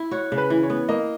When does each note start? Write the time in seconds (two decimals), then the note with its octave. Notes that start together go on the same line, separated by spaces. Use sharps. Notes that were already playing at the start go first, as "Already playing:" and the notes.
Already playing: E4
0.11 F#4 C#5
0.32 C#3
0.38 B4
0.50 E3
0.63 C#5
0.70 B3
0.89 A#3 D#5